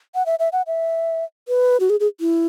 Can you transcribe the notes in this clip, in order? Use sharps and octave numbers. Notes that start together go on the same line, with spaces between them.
F#5
E5
E5
F#5
E5
B4
F#4
G#4
G#4
E4